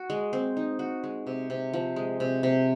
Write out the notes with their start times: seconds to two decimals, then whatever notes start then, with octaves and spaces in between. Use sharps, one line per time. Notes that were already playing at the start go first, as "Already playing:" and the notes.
Already playing: F#4
0.10 G#3
0.33 C4
0.57 D#4
0.79 F#4
1.04 G#3
1.27 C3
1.50 C3
1.74 F3
1.96 G#3
2.20 C3
2.43 C3